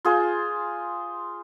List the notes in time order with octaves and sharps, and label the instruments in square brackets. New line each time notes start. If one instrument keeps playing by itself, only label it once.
[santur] F4 G#4 C5